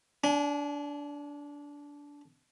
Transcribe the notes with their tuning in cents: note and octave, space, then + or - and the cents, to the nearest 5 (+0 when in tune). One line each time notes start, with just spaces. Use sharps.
D4 -20 G#5 +25